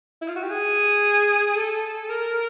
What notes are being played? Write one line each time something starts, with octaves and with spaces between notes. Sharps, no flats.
E4
F4
F#4
G4
G#4
A4
A#4